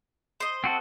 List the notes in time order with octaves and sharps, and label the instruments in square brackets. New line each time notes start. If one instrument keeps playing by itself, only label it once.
[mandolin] C5 D#5
[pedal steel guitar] C4 F#4 A4